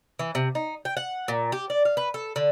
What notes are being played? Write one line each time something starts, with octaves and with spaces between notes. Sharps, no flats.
E3
C3
D#4
G5
F#5
A#2
G4
D5
F5
B4
A4
D3